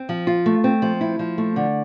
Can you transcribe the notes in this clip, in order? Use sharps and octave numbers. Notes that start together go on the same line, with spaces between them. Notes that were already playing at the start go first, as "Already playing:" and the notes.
Already playing: C4
F3
F4
A3
C4
F3
E4
F3
A3
D3